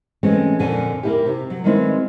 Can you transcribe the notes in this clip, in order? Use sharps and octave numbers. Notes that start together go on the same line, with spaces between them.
E3 G#3 A3 C4 C#4
F2 A#2 D3 G#5
A#3 E4 G4
C3
F#3
D#3 G3 G#3 B3 C4 E4